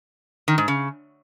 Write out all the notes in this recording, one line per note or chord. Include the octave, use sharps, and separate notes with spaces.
D#3
G#2
C#3